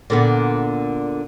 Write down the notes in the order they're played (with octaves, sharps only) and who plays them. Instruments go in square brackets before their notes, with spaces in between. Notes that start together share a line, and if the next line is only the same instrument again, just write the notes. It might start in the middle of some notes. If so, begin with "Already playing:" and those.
[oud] A#2 D3 B3